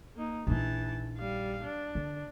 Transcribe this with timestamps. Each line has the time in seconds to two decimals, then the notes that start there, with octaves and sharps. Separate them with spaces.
0.16 A#3 D#4
0.47 A#1 E3 D#4 A5
1.18 G3 F5
1.63 D4
1.95 D3